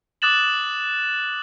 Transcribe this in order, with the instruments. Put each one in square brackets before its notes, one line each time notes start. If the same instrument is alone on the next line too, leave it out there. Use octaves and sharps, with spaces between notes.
[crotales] D6 D#6 F#6 A6 E7 F#7